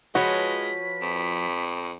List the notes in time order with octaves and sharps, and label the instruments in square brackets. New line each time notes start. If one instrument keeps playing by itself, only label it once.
[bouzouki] F3 B4 C#5 [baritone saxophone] G#3 [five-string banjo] F#4 [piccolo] B6
[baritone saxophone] F2